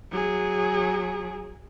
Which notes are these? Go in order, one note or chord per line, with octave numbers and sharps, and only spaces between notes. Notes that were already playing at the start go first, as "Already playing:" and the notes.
F#3 G#4